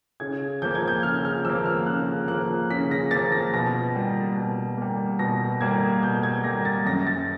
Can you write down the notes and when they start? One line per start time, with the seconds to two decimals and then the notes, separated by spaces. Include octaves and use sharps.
0.20 C#3 G#6
0.62 F3 A#3 G6
0.75 G#6
0.88 G6
1.03 C#3 F6
1.25 F6
1.45 F3 E6
1.49 A#3
1.66 F6
1.86 C#3 F#6
2.28 F3 A#3 F#6
2.70 C#3 B6
2.91 A#6
3.11 A#3 A6
3.15 F3
3.32 A#6
3.53 B2 A#6
3.95 G3 A#3
4.37 B2
4.78 G3 A#3
5.19 B2 A#6
5.61 G3 A#3 G#6
6.03 B2 G6
6.23 G#6
6.44 G3 A#3 A#6
6.65 A6
6.86 F#2 A#6
7.07 A6